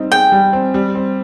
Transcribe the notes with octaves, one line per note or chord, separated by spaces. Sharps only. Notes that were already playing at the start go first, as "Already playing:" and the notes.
Already playing: G3 C4 D#4
G#4 G5
G3
C4
G3
C4